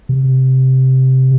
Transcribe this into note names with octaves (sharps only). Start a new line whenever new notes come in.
C3